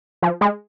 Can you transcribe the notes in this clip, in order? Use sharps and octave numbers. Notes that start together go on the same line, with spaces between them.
F3
G#3